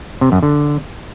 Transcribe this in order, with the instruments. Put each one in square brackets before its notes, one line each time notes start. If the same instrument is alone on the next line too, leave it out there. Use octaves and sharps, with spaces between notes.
[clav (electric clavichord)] C3
F#2
D3